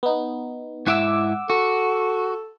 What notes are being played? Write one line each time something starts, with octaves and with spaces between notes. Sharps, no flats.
B3 D#4
G#2 E4 E5 F#5 D6 E6
F#4 A4